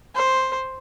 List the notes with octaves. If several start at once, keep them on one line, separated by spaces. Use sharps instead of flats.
C5